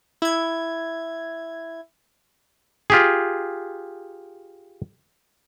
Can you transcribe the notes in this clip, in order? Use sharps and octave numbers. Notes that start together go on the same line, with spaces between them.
E4 G#6
F4 G4 G#4